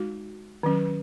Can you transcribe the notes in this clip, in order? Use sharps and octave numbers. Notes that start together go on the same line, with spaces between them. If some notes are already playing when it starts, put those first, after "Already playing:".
Already playing: G#3 D#4 F#4
D#3 F#3 C#4